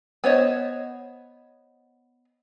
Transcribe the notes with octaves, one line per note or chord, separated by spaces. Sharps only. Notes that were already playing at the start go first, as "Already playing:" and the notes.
B3 C5 C#5 D#5